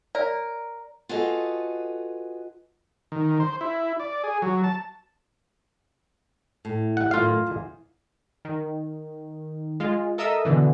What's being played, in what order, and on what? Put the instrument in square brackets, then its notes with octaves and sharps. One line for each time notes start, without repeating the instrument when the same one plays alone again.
[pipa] A#4 [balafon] C#5 [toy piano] D5
[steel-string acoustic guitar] F4 F#4 G#4 A4 B4 D#5
[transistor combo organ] D#3
C5
E4
D5
G#4
F#3
A5
[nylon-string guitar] A2
[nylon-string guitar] G3 [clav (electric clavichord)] F#5
[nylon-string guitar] F#2 A2 D#3 [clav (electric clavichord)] F4 F5
[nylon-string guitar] E2
[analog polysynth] D#3
G#3 F4
A4 A#4 D#5 E5 D#6 E6
B2 D3 E3